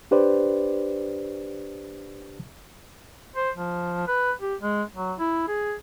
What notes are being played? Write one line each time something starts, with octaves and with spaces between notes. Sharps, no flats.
D4 G4 B4 C5 D5
C5
F3
B4
G4
G#3
F#3
E4
G#4